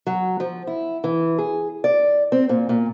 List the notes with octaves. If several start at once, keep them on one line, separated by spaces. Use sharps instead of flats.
F#3
F3
E4
E3
G#4
D5
C4
A#2
A#2